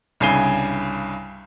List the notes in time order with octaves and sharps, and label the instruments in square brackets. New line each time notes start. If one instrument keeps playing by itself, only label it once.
[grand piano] C2 G2 C#3 G#5 C7 G7